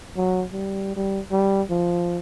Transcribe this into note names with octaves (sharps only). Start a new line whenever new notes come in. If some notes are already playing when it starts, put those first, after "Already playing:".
F#3
G3
G3
G3
F3